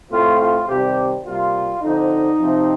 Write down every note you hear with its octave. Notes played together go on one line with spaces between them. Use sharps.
A2 A3 C4 F4
F4
C3 D#3 G3 C4 G4
C3 G3 A#3 F4
D3 F3 C4 D#4
C3 F3 C4